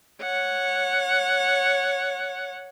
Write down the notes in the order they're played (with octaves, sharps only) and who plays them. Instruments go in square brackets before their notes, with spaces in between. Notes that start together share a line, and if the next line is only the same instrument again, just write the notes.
[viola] C#5 F#5